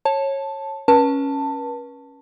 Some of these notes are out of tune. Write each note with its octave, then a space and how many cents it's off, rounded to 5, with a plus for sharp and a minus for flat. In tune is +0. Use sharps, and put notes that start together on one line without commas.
C#5 -20 A5 +0
C#4 -5 B4 -40 A5 +15